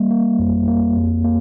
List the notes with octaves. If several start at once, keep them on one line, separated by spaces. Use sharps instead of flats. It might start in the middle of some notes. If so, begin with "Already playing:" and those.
Already playing: G3 A#3
A#3
F2
A#3
F2
A#3